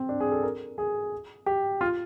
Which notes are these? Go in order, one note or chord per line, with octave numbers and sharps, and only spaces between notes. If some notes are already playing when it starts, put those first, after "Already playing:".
Already playing: C4
D4
G#4
A4
A#4
G#4
G4
F4